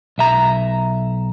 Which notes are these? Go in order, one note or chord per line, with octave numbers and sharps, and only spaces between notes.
B1 E5 A#5